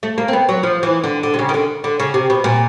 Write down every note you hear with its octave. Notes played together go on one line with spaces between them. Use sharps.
A3
A#3
C4
B3
F#3
F3
E3
D3
D3
C3
C#3
D#3
D3
D3
C#3
C3
B2
A#2